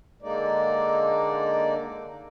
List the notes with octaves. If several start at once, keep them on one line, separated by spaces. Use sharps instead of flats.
D3 G#3 A#3 D#4 D5